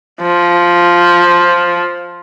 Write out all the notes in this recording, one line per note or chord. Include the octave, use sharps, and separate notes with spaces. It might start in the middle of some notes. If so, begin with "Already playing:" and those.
F3